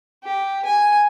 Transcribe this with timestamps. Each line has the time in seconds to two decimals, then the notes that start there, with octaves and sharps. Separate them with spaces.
0.24 G4
0.65 G#5